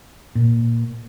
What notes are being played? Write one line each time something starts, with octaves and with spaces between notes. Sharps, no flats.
A#2